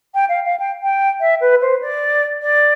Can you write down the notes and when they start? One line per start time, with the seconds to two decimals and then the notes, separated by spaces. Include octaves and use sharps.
0.14 G5
0.29 F5
0.44 F5
0.59 G5
0.82 G5
1.20 E5
1.41 B4
1.61 C5
1.81 D5
2.42 D5